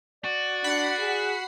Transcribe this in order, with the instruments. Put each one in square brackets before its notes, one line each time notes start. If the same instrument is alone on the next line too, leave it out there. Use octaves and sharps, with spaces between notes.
[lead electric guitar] F#4 [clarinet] D5
[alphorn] D4 [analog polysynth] F#5 B5 C7
[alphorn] G#4